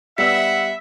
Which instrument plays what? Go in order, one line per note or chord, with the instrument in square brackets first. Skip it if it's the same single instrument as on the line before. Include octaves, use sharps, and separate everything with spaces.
[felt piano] G3 B3 D5 [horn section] E5 [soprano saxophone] F#5 [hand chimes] B6